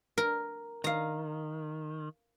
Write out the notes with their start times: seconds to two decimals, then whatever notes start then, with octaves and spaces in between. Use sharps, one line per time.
0.18 A#4
0.84 D#3 F5 A#5